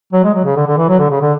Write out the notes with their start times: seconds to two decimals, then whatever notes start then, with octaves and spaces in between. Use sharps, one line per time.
0.13 F#3
0.24 G#3
0.34 F#3
0.45 C#3
0.56 D3
0.67 D3
0.77 E3
0.89 F#3
0.99 D3
1.10 C#3
1.21 D3